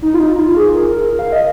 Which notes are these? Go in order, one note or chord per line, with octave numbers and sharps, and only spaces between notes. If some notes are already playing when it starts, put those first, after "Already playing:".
D#4
F4
D#4
F4
G#4
A#4
F5
D#5